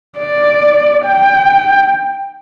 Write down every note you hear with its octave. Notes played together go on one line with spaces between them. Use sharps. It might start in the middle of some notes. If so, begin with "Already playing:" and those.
D5
G5